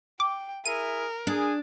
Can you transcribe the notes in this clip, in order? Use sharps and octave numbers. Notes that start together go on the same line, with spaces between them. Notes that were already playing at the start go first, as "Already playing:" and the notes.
G5 D6
E4 G#4 A#4 E5 D#7
D4 G#4